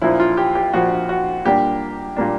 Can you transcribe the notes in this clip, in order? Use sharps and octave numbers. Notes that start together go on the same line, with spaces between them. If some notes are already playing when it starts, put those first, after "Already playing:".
A#1 A#2 F3 E4
F4
G4
G4
A#1 A#2 F3 F#4
F#4
A#2 G3 A#3 D4 G4
A#2 G3 A#3 D4